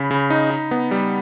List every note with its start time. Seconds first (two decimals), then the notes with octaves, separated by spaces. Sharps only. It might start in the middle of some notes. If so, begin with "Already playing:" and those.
Already playing: C#3 B5
0.11 C#3
0.30 D#4
0.51 D#4
0.71 B3
0.91 G3